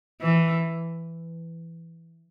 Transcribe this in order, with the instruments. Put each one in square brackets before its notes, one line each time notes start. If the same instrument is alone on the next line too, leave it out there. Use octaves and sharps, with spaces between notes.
[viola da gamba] E3